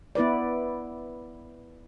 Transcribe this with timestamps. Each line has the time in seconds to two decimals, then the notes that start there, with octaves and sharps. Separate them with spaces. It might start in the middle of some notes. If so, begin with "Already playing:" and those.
0.15 B3 E4 B4 D5